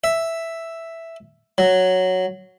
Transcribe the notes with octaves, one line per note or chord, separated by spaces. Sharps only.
E5
F#3